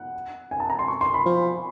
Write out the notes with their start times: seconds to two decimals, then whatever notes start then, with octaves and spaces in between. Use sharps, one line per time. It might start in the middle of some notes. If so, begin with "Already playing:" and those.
Already playing: F#5
0.51 G#5
0.60 A5
0.70 A#5
0.79 C6
0.88 C#6
1.01 C6
1.14 B5
1.26 F3